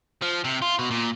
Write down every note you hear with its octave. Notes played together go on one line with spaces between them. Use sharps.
F3
C3
F4
B2
A#2